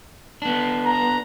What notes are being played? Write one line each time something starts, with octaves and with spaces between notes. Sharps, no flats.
B3 D4
A#5